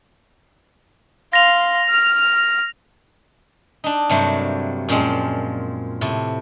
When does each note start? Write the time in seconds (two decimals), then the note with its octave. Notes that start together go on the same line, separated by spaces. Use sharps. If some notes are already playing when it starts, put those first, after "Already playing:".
1.33 F5 C6 A#6 F7
1.90 F6
3.84 D4 D#4
4.10 G2 C3 F#3 A3 A#3 C5
4.89 F#2 A#2 F3 G#3 C4
6.01 A2 C3